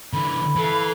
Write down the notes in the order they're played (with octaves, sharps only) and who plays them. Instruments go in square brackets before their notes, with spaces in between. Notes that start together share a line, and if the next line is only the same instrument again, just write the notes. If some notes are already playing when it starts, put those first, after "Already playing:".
[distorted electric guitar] D3 E3 [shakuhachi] B5
[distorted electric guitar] E3 [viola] A4 F5